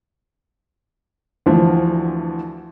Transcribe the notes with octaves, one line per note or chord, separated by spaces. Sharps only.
D2 E3 F3